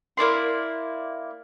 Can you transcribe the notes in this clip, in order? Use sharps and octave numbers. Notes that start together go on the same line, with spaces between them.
A#3 E4 D5 C6